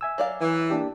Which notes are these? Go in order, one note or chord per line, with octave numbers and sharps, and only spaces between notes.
E5 G#5 E6
F#3 D5 F5
E3
A#3 D4 G4